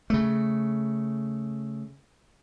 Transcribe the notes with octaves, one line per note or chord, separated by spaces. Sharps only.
C#3 A3